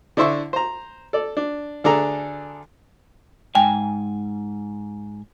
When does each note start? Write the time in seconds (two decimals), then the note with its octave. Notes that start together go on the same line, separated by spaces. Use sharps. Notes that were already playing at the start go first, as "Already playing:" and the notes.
0.17 D3 D4 E4 C5 E5 C#6
0.53 C5 A#5
1.13 A4 D5
1.37 D4
1.84 D2 D4 G#4 A4 A#5
3.55 G#2 G5 G#5